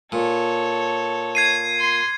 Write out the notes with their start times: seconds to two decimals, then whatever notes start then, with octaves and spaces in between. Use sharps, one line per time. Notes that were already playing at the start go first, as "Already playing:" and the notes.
0.12 A#2 A4 C#5
1.35 G#6 C7 D#7
1.79 C6